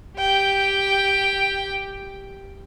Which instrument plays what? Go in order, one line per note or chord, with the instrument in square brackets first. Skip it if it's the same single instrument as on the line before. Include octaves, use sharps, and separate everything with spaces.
[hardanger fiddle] G4 G5